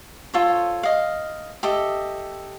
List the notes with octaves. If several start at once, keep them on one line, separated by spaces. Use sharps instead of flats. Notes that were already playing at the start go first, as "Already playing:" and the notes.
F4 A4 C5 C#5
D#5 F5
G4 A4 D#5 E5